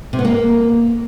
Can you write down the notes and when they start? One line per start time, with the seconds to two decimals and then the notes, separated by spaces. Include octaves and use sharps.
0.13 C3
0.19 B3
0.25 A#3